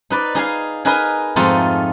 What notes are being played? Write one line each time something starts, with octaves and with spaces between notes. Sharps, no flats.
D#4 B4 D5
D#4 G#4 F5 G#5
D#4 G#4 A#4 B4 D#5 G#5
F2 G#2 A3 D#4 F4